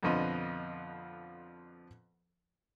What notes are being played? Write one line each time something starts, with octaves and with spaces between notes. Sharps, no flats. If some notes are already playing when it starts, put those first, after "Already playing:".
F2 B2 D3 F3 F4 D#5